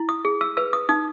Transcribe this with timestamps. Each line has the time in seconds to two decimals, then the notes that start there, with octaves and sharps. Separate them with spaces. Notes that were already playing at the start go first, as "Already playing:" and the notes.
Already playing: E4
0.09 D#6
0.25 G#4
0.41 E6
0.57 B4 E6
0.73 D#6
0.89 D#4 D#6